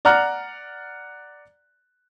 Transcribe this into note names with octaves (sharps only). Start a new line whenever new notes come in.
D5 F#5 A#5 F6 F#6